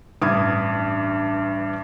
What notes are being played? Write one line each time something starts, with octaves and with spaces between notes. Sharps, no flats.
A1 G2 D6 D#6 G#6